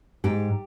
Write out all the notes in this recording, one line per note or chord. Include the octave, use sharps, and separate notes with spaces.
G#2 G4